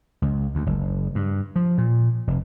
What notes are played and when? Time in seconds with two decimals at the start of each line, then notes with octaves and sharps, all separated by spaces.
0.22 C#2
0.55 D2
0.66 F#1
1.15 G2
1.56 F3
1.78 A#2
2.27 F1